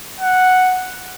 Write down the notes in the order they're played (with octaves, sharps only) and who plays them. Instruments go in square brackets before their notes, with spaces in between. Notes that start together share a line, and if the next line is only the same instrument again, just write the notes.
[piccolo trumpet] F#5